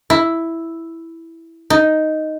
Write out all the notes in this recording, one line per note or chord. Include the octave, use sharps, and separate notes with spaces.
E4
D#4